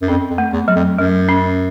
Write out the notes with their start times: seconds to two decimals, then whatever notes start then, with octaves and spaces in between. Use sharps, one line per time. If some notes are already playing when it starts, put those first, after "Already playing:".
0.02 F#2
0.08 F2 C#4
0.30 F2
0.38 A3
0.53 E2
0.68 F#3
0.76 F2
0.99 F#2 F#3
1.29 C#4